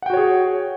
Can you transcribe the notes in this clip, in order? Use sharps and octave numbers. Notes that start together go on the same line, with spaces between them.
F#4 G#4 C#5 F#5 G5